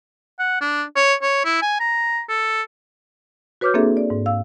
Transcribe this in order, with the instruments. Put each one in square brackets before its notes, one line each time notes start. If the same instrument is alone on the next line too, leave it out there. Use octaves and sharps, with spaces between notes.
[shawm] F#5
D4
C#5
C#5
E4
G#5
A#5
A4
[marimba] F#4 B4 C#5 D6 F6 G6
A#3 C4 D4 G#4 A4 E5
D5
G#2
F5 E6